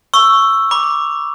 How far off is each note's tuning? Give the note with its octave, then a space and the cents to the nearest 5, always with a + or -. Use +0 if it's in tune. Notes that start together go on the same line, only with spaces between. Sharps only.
C#6 +0 E6 +5
B5 -30 D6 +0